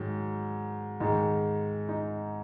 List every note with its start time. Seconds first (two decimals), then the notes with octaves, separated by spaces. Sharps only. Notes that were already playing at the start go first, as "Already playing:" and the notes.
Already playing: G#2 D#3 F#3
1.00 G#2 D#3 G#3 D#4
1.89 D#4